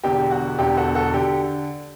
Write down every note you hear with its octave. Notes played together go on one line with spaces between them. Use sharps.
E1 E2 D3 G4
F#4
E1 E2 D3 G4
F#4 A4
F#4 A4
D3 G4